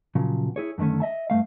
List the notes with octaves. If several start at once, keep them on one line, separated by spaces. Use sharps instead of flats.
A#2 C#3 F3 F#3
E4 G#4 C#5
F#2 D3 D#3 A3 C#4
D#5 E5 A5
G2 C#3 A3 F5